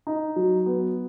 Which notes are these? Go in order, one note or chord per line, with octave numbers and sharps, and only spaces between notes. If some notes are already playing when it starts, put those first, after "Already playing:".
D#4
F#3
B3